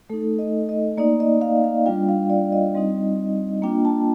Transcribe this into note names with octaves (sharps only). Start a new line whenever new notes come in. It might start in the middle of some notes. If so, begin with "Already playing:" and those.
A3 D#4 A4
D#5
D#5
A#3 D#4 D5
D#5
F5
F5
G3 D4 F4 G5
F5
D5
D#5
G3 C4 D#4
A#3 D4 F4 G5
A5